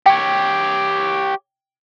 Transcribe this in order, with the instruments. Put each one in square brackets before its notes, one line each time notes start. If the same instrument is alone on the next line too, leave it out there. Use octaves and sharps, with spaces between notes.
[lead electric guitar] G4 C#5 [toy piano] G5